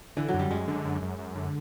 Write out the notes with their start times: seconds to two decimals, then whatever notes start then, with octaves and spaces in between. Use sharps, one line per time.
0.17 D3 E3
0.29 F#3
0.34 F#2
0.39 G3
0.51 F#2 G#3
0.68 D3
0.85 F#2
1.02 F#2
1.19 F#2
1.36 D3